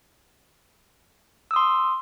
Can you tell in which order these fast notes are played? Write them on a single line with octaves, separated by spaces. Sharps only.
E6 D#6 C6